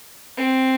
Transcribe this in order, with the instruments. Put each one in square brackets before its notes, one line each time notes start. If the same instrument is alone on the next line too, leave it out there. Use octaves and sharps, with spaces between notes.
[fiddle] C4